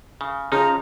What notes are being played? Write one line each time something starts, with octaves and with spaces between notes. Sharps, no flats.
C#3
C#3 F3 D#4 A#5